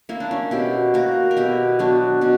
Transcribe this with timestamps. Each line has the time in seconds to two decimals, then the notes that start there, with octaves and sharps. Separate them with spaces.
0.09 A#3 E4
0.20 D4
0.31 C#4 E4
0.51 B2 E4 G4
0.94 A#3 F#4 A#4
1.31 A#4
1.37 B2 E4 G4
1.79 F#3 B3 D4 F#4
2.21 B2 C#4